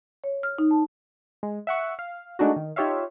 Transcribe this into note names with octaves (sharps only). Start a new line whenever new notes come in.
C#5
F6
D#4
A5
G#3
E5 F#5 C#6
F5
G#3 A3 D4 D#4 F#4
D#3
D#4 F4 G4 C#5 E5 F5